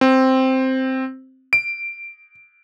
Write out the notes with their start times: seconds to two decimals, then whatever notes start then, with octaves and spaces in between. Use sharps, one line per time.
0.01 C4
1.53 D7